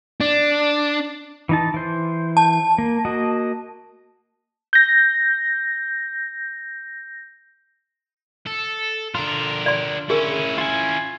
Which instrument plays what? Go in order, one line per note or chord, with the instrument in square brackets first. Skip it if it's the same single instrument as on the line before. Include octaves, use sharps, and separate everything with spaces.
[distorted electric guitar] D4
[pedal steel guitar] E3 D#4 A5
E3 C5
[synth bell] A5
[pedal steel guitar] A#3
A#3 F#4 D#5
[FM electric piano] G6 A#6
[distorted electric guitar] A4
[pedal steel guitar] D3 F4 [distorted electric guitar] D4 A#4
[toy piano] D5 C6
[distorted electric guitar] C#4 E4 [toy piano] G#4 A#4
[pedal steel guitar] F4 G#5